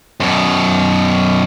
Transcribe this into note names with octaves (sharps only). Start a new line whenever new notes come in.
F#2 B2